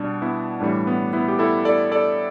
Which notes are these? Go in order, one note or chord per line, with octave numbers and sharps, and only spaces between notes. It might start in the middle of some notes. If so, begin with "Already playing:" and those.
Already playing: B2 G3 D4
B3 E4
A2 E3 G3 D4
B3
B3 E4
G4
E4 A4
A4 D5
A4 D5